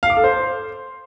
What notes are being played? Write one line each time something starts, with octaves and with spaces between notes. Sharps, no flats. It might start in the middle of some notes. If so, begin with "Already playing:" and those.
F5
D6
A4
C5